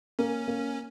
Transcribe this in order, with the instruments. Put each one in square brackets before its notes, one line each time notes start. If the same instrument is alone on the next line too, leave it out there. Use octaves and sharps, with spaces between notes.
[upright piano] A#3 [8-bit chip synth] C#4
[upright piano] A#3